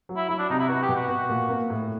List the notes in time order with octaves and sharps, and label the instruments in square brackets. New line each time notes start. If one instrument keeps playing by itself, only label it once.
[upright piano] F#3
[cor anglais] E4
[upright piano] F#3 [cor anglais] E4
[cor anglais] D4
[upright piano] C3 [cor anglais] D#4
[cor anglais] E4
[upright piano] B3 [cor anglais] F#4
[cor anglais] G4
[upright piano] B2
[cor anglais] F#4
[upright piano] B3
A#2
A#3
A2